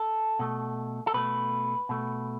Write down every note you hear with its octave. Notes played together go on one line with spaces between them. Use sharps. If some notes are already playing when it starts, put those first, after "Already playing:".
Already playing: A4
B2 A3
A4
B2 A3 B4
B2 A3